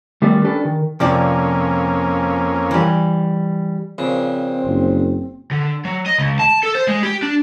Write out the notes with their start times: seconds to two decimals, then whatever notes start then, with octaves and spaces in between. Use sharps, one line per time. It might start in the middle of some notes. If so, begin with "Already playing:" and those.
0.22 D#3 G3 A3 B3 D5
0.44 C#4 D4 G4 A4 B4 D5
0.65 D#3
1.00 F2 C3 F3 A#3 C#4 D5
2.71 E3 G3
3.98 A#1 C#3 C4
4.65 F#1
5.51 D3
5.85 F#3
6.06 D#5
6.18 C#2
6.39 A5
6.63 A4
6.75 C5
6.88 G#3
7.03 G4
7.22 D4